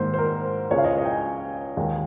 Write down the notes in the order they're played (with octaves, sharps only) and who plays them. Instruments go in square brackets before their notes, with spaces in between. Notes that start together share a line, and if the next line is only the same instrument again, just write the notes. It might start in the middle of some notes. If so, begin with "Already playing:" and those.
Already playing: [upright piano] G#2 D#3 A#3 C5
C5
A#4
C#2 C#3 G#3 C#5
F5
D#5
D#5
G5
G#5
D#2 D#3 G#3